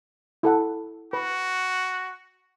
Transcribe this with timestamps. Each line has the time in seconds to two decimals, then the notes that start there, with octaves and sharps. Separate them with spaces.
0.43 E4 A4 F#5
1.13 F#4 B4